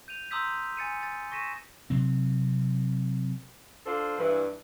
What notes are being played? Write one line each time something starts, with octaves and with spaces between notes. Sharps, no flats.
G6 D#7 F7
A#5 C6 D#6 E6 G6 B6
G#5 A6 C#7 D#7
A6
C#6 A#6 B6 D#7 E7
C3 F#3 C4
D4 F4 A4 C5
G2 E3